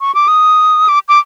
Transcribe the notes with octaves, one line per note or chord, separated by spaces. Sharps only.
C#6
D6
D#6
D6
D6